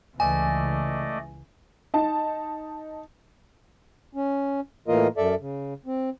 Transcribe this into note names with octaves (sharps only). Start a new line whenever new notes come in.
C#2 E3 A3 D5 D#5 G#5
D#4 A5
C#4
A2 E3 A#3 F4 A#4 D#5
F#2 A4 D5 E5
C#3
C4